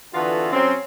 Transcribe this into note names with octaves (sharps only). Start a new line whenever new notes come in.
D3 E3 B3 F4 F#4 A4
F#3 C4 C#4